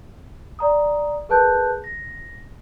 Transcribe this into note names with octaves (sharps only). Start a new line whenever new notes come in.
D5 A#5 D#6
G#4 A#4 B4 A5 F#6 G6
A#6